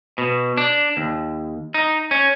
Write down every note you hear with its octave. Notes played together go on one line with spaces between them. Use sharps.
B2
D4
D#2
D#4
C#4